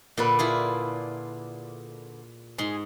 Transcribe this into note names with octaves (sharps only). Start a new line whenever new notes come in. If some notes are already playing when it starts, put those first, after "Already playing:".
A#2 D3 D4 A4 B4
E4 F4 G#4
G#2 G#4 C6